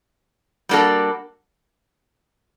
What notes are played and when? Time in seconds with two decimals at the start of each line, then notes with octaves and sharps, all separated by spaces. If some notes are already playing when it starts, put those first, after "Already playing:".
0.69 G3 A#3 D4 F#4 A4